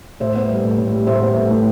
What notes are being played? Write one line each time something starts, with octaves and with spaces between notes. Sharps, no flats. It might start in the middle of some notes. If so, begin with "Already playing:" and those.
A2 C5 E5
B3
G3
A2
A2
G3
A2 C5 E5
B3
A2
A2